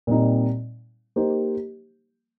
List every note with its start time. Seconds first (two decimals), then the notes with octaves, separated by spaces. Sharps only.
0.07 A#2 G3 C4 D#4
1.16 A#3 D#4 G4 C5